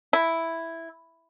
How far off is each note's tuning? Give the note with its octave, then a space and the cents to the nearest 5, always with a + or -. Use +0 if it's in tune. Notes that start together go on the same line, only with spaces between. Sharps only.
E4 +0